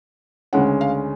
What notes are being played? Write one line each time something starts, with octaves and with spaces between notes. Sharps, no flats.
D2 C#3 G#3 C#4 F#5
F5